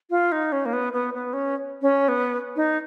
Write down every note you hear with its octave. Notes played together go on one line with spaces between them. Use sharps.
F4
D#4
C#4
A#3
B3
B3
B3
C#4
C#4
B3
D#4